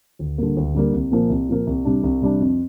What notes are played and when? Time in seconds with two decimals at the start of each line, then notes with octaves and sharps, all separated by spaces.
0.19 D2
0.38 D3 G3 A#3
0.57 D2
0.75 D3 G3 A#3
0.93 C2
1.12 A#2 F3 A#3
1.30 C2
1.49 A#2 F3 A#3
1.67 C2
1.85 C3 G3 D4
2.03 C2
2.22 C3 G3 D4
2.41 F2